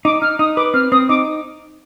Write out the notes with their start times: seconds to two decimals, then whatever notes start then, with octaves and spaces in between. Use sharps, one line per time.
0.05 D#4 D6
0.22 D#4 F6
0.39 D#4 D#6
0.57 B4 D6
0.74 C4 F6
0.92 C4 D#6
1.09 D#4 D6